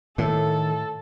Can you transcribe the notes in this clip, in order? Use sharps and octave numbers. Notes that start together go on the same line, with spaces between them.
A2 D#3 A4